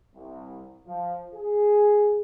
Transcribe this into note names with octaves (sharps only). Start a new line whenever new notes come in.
C2
F3
G#4